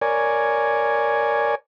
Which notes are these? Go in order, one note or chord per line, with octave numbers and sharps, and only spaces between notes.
A#4 C#5 D5 G#5